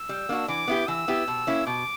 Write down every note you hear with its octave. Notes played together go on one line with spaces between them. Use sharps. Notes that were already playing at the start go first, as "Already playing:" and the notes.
Already playing: E6
G3
A#3 D4 F#4
E3 D6
B3 E4 G4
E3 E6
B3 E4 G4
B2
A#3 C#4 E4
B2 D6